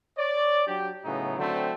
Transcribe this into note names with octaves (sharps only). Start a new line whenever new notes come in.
C#5 D5
F#3 D4 G4
A2 C#3 F#3 B3 D#4
D3 F#3 A3 C4